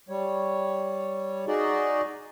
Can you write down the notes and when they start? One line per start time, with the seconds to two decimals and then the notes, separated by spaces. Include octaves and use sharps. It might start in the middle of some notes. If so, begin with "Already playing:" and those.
0.09 G3 C#5
1.47 D#4 F#4 G#4 D5 D#5